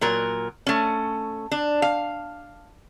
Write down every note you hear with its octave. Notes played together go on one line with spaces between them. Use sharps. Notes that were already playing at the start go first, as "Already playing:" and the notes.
A#2 F#3 A#4
A3 C#4
D4
F5